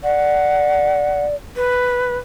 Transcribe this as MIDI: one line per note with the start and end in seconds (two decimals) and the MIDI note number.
0.04 1.35 74
0.04 1.25 78
1.56 2.18 71